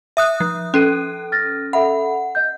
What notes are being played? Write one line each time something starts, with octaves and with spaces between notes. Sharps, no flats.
E5 D#6 F#6
F3
C#4 A4 F#6 C7 D#7
F6 A6 A#6
A4 E5 F#5 B5
D#5 G6